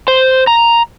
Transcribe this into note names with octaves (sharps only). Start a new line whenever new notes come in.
C5
A#5